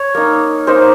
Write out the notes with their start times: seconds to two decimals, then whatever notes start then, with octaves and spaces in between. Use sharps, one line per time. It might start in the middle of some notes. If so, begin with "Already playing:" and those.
Already playing: C#5
0.15 A#3 D#4
0.67 A#3 D#4 C5